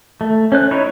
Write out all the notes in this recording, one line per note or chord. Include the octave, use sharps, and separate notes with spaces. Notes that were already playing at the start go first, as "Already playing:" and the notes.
A3
C#4 C5 F#6
D#4 E4 C#5